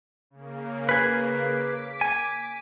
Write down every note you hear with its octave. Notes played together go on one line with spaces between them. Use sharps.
C#3 A#3
G#4 B4
D6 B6
G#5